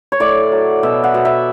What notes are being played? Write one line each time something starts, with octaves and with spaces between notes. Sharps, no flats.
C#5
A2 D5
F#3
B2 E5
F#5
B2
E5